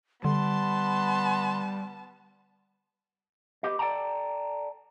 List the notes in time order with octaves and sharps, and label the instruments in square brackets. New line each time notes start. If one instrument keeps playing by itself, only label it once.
[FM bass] D3 [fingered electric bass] G3 [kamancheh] B3 A5 [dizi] C6
[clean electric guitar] B3 G4 D#5
A4 D5 F#5 G5 A5 A#5